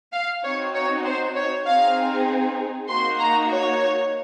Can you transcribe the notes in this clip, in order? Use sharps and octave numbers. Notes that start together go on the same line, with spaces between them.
F5
C4 D#4 F#4 C#5
C#5
C5
C#5
C4 D#4 G#4 F5
A#3 D#4 F#4 C6
A#5
C#5